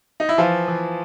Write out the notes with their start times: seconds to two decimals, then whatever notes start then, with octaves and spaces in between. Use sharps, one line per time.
0.20 D#4
0.29 E4
0.38 E3 F3 F4
0.68 E3